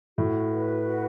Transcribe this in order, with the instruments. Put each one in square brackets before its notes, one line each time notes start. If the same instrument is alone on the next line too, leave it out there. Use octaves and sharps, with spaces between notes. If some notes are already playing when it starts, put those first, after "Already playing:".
[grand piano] A2 [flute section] F#4
[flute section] B4
F#4